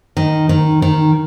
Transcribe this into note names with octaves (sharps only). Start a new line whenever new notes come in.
D#3
D#3
D#3